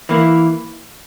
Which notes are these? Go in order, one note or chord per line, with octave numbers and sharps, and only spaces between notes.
E3 A#3 E4